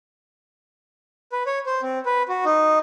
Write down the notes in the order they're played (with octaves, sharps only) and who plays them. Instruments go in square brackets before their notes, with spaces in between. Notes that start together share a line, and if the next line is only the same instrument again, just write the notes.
[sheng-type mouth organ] B4
C#5
C5
C4
B4
F#4
D#4